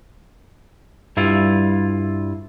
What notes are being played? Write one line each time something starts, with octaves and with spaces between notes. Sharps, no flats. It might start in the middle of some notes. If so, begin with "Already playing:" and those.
G2 G3 E4 F4